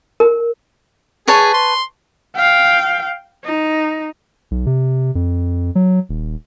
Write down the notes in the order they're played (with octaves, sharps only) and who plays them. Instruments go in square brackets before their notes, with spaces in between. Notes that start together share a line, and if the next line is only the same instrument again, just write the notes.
[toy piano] A#4
[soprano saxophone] G#4 [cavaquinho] B4 C#5 A5
[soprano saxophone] C6
[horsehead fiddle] F5 G5
D#4
[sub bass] B1
C3
F2
F#3
D#1